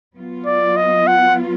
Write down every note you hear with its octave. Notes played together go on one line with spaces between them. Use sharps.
F#3 B3 F4
D5
D#5
F#5